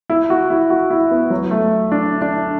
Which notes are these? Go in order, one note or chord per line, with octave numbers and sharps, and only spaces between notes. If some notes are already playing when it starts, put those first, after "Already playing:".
E4
F#4
E4
F#4
E4
B3
F#3
A3
D4
D4